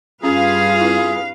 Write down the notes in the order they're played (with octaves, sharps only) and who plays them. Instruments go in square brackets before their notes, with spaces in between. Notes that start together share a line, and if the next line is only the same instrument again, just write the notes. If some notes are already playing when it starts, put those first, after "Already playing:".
[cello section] G2 B4 F5 [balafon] C#4 [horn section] F4 G#4
[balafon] C4 E4